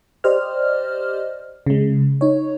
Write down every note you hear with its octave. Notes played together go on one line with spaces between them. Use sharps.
G4 C5 D5 D#5 F6
C#3 G#3
D#4 C#5